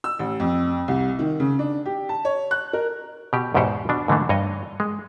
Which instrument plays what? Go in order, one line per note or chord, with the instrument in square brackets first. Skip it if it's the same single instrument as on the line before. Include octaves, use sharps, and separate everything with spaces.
[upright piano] E6
A1
F2
C2
D#3
C#3
D4
G4
A5
C#5
F#6
A#4
[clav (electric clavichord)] B2 G4
E2 G#2 B2 G4 C5 F#5
B2 D4
G#2 D3 E3 A3
G2 C#5 D#5
G#3